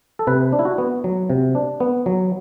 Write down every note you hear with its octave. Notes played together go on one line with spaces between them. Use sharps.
A4
C3 B4
D4
E4
F#4
B3
F#3
C3
D4
B3
F#3